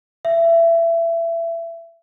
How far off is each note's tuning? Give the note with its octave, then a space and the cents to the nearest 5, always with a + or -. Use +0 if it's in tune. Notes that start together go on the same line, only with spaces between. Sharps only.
E5 +25